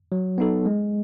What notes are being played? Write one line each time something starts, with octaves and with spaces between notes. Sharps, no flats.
F#3
B3 D#4 A4
G#3